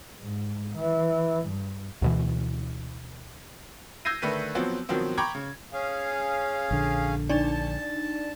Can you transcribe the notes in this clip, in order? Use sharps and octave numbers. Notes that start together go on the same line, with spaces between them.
G#2
E3
G2
D2 B2 E3
E6 G6 G#6 A#6 C7 D#7
D3 D#3 A3 B4 D#7
F3 F#3 B3 C4
B2 D#3 F3 F#3 B3 C4
G5 A#5 B5 C#6 D6 G#6
C#3
C#4 G#4 F5
A#1 D3
D4 D#4 D5 A5